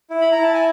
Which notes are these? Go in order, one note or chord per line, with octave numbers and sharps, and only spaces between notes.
E4
B5
A#5
E4
A5
G#5